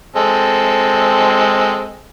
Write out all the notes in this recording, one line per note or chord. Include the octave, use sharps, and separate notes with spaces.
G#3 C4 A4